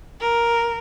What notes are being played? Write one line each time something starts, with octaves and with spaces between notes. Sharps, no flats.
A#4